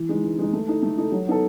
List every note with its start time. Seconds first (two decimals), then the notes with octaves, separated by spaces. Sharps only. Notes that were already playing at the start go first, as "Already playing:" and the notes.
Already playing: E3
0.09 G#3 D#4
0.24 E3
0.38 G#3 D#4
0.53 A3
0.68 D#4 A4
0.83 A3
0.98 D#4 A4
1.12 F#3
1.27 B3 D#4 A4